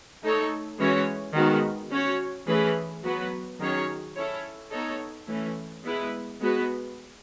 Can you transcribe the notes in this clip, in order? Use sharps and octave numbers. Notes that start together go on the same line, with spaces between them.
A3 D#4 A4 C#5
E3 G#3 C#4 F#4 C#5
D#3 G#3 B3 F#4
C#4 F#4 C#5
E3 A3 C#4 G#4 B4
F#3 B3 F#4 B4
D#3 F#3 C#4 G#4 C#5
C#4 E4 A4 C#5
B3 D#4 A4 C#5
E3 A3 C#4
G#3 B3 E4 B4
G#3 B3 F#4 B4